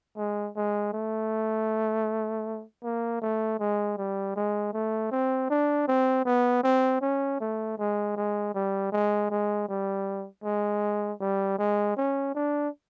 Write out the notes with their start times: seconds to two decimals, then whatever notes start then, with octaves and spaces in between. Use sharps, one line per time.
0.17 G#3
0.56 G#3
0.93 A3
2.83 A#3
3.22 A3
3.60 G#3
3.98 G3
4.36 G#3
4.73 A3
5.12 C4
5.50 D4
5.88 C4
6.25 B3
6.64 C4
7.02 C#4
7.40 A3
7.78 G#3
8.17 G#3
8.55 G3
8.92 G#3
9.30 G#3
9.69 G3
10.44 G#3
11.21 G3
11.59 G#3
11.97 C#4
12.35 D4